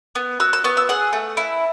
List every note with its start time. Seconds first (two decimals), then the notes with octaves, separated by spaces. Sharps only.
0.15 B3
0.40 F#4 E6
0.53 E6
0.64 B3 C#6
0.77 E6
0.89 G#4 F#5
1.13 A3
1.37 E4